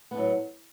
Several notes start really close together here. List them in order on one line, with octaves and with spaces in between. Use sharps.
B3 A2 F#3